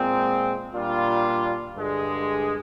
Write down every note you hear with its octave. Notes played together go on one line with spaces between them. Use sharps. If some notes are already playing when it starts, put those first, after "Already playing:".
Already playing: A#2 G#3 C4
A#2 G3 D4 F4
G2 D3 G#3